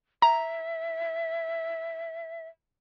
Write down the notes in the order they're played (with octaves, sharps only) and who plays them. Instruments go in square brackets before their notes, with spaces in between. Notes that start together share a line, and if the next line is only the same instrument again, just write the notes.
[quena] E5 [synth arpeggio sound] A#5